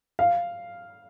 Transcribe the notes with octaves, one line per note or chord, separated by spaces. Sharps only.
F5